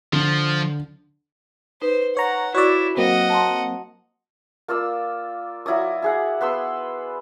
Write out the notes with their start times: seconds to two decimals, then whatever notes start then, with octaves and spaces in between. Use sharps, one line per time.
0.13 D3 F3
1.82 D#4 B4 C5
2.17 C#5 F#5 A#5
2.55 E4 F#4 C#5 D5 C#6 E6
2.97 F#3 A#3 C4 D#5 F#5
3.30 A5 A#5 C6
4.68 A#3 F4 D5 E6
5.66 F#3 E4 D5 D#6
6.02 E4 G#4 F#5
6.41 B3 B4 C6 E6